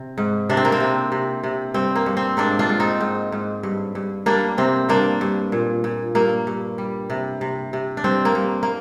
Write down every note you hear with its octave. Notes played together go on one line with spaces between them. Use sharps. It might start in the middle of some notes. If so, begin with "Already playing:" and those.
Already playing: C3
G#2
C3 D4
C4
A#3
C4
C3
C3
C3
G2 C4
A#3
G2
C4
G#2 A#3 D4
D4 F4
G#2
C4 D#4
G#2
G#2
G2
G2
G3 A#3 D4
C3 C4
G2 A#3 D4
G2
A#2
A#2
G2 A#3
G2
G3
C3
C3
C3
D4
G2 C4
A#3
G2
A#3